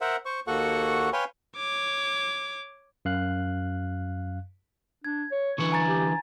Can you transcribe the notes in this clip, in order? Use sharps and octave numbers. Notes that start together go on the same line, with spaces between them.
A#4 C5 E5 F#5
C5 C#6
D#2 A#3 F#4 A4 F#5 C#6
B4 C#5 F5 G5 G#5 C6
C#5 D6
F#2 F5 F#6
D4 G#6
C#5
D3 E3 B4 C#6
G#5 A#5 A6
G4